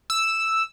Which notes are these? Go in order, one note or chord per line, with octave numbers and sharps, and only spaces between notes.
E6